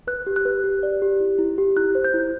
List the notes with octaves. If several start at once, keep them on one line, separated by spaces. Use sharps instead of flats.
B4 F#6
G4
F#6
B4
G4
D5
G4
E4
E4
G4
E4 F#6
C5
G6
E4